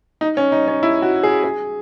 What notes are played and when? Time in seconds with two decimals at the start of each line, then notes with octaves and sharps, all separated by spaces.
0.21 D#4
0.37 C#4
0.52 D#4
0.68 C#4
0.83 E4
1.02 F#4
1.23 G#4
1.44 G#4